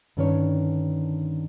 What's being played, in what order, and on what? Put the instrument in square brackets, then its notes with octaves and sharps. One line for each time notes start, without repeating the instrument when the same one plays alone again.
[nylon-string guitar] G2 D3 D#3 C#4 D4 C#5